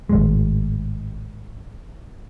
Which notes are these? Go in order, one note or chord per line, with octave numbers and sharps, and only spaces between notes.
G#1 F#2 A2 G#3